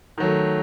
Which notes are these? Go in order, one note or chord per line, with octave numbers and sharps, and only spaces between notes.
D#3 F#3 A3